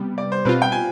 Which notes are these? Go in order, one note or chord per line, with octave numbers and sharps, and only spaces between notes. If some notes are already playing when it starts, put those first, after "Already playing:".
Already playing: C3 G3 B3
D5
C5
B2 G3 C4 F4 B4
G5
G#5